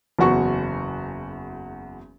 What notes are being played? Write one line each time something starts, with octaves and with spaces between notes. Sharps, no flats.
F#1 E2 F#4 C#6